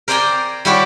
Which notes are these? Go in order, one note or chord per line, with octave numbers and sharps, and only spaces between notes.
A#4 C5 D5 G5 G#5 A#5
G3 E4 F#4 G4 C#5 D5